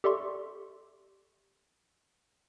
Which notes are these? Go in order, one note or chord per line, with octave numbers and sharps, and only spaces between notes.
G4 A4 D5 E5 C6 C#6